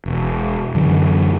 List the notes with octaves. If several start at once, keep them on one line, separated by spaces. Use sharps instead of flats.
E1
F#2 D3 E3